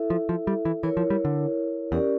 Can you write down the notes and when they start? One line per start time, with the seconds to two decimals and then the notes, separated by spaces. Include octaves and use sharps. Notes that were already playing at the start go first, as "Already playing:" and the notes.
Already playing: E4 A4 E5
0.10 F3
0.29 F3
0.47 G3
0.65 E3
0.83 E3 E4 A#4 C#5
0.97 F3
1.10 G3
1.25 D3
1.92 E2 C#4 G4 A#4 D5